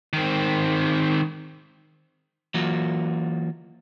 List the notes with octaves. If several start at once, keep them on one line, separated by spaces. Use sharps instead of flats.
D#3 C4
E3 F#3 A#3 F4 F#4